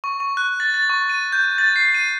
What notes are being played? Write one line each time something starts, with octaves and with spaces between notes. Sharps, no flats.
C#6
C#6
F#6
A6
A6
C#6
D#7
G6
A6
C7
D#7